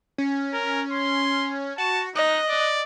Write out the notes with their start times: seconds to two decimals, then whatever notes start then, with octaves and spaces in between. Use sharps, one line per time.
0.18 C#4
0.54 A#4
0.92 C6
1.78 F#4 A5
2.16 D#4 D#5 F#6
2.49 D5